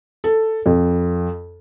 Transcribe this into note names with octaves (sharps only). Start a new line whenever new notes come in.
A4
F2